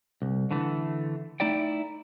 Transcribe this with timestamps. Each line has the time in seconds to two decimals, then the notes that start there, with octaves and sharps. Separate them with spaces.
0.22 C2
0.51 D3 E3 A3
1.40 A3 D#4 E4 D5 G5